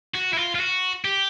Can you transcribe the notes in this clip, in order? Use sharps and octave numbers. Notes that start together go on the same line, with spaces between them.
F#4
E4
F4
F4
F#4
G4